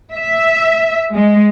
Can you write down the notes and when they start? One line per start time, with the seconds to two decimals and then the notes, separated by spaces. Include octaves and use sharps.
0.13 E5
1.14 G#3